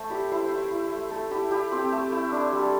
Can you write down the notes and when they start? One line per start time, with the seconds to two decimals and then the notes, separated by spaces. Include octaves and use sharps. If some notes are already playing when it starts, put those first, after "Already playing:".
Already playing: A3 A4 C5
0.10 E4 G4
0.31 E4 C5
0.45 C5
0.51 E4
0.58 C5
0.71 E4
0.91 A3
1.11 A3 A4
1.31 E4 G4
1.51 E4 G4
1.72 C4 G4
1.92 A3
2.12 E4
2.32 D4
2.52 G3
2.62 A4